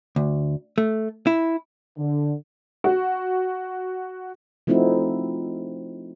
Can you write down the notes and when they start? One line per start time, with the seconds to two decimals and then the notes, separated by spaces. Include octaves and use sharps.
0.16 D2
0.78 A3
1.27 E4
1.97 D3
2.84 F#4
4.67 F3 A3 C4 D#4 E4 F#4